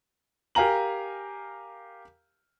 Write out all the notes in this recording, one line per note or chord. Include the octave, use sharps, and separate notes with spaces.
G4 A#4 F5 G#5 A#5 F#7